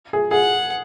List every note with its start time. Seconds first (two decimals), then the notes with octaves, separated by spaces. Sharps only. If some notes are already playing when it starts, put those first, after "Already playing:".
0.13 G#4
0.31 G#4 F#5